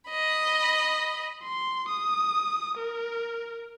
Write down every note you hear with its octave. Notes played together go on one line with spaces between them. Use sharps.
D#5 B5
C6
D#6
A#4